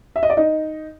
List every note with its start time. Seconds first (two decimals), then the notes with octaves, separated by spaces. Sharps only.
0.16 E5
0.23 D#5
0.30 D5
0.37 D#4 D#5